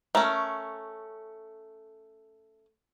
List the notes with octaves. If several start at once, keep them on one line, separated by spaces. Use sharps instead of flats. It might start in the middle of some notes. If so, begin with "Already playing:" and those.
A3 C#4 A#4